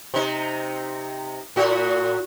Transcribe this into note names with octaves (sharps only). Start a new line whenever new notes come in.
C3 D#4
A2 F#4